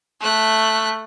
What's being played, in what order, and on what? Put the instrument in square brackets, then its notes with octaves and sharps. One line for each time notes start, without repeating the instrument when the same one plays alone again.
[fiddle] A3 F#6